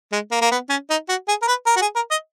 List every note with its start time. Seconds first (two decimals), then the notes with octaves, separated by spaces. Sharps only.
0.12 G#3
0.31 A#3
0.41 A#3
0.51 B3
0.70 C#4
0.90 D#4
1.09 F#4
1.28 G#4
1.42 A#4
1.48 B4
1.66 A#4
1.77 F#4
1.82 G#4
1.95 A#4
2.11 D#5